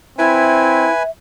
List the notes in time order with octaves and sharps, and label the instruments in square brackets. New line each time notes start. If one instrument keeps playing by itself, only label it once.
[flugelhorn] C4 [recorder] E4 [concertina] B4 G#5 [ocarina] E5